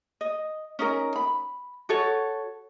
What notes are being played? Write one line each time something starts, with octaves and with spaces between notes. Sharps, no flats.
D#5
C#4 D#4 A#4
B5
F#4 A4 C#5